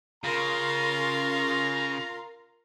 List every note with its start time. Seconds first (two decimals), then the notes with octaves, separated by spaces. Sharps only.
0.24 C#3 F4 A#4 A#5 C6